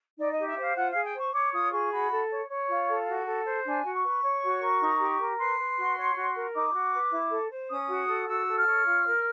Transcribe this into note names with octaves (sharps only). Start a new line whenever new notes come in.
D#4 D5
D#5
G4
E5
C5 F5
F4 F#5
F5
G#4
G5
C5 C#6
C#5 D6
F4 D#6
G#4 C#6
F#4 B5
A4
C#5
C#5
F4
A4
F#4
A4
C5
D4 G#5
F#4
C#6
B4
C#5
F#4
A#4
D#4
G4
A#4
B4 C6
B4
F#4
C#5
F#4
A#4
D#4 D6
F#4
B4
E4
A4
C5
C#4 D#6
F#4
A4
F#4 E6
A4
F6
C#5
F4
A#4